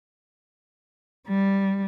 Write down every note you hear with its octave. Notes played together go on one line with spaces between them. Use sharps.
G3